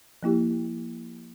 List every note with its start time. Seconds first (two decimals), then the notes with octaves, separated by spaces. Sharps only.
0.23 F3 A#3 E4 G4